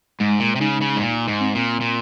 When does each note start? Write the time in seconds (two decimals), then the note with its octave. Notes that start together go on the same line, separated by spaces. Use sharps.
0.20 G#2 G#3
0.40 A#2
0.56 C3
0.60 C#3 D#4
0.81 C#3
0.96 G#2
1.01 C#2 A#2
1.28 G#2
1.41 C4
1.55 A#2
1.81 A#2